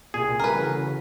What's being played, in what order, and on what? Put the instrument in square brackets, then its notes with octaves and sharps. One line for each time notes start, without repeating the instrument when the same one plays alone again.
[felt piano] C2 [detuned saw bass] A#2 [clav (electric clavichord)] G#4
[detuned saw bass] C#3 [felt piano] G3 A3 [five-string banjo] A#4 B4
[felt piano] E3 F#4 A4